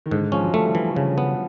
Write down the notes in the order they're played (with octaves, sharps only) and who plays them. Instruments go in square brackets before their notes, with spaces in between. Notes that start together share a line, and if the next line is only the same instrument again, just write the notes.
[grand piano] D#3
[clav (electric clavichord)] G#2 [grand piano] D3
[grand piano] F3 [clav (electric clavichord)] C#4
[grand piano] F#3
[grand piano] G3 [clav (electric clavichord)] A3
[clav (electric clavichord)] E3
C#3
B3